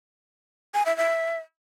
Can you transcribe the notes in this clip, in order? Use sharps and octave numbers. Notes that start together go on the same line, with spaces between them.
G#5
E5
E5